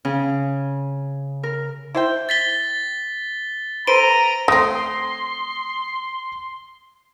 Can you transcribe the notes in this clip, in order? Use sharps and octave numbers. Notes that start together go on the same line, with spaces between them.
C#3
A#4
E4 C5 G5
A6 B6 G7
A4 B4 C5 A#5 D7 D#7 G7
A3 C4 C6 D#6 A#6